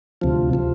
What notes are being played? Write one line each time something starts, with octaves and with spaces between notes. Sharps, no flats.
D2 C3 F3
C3 F3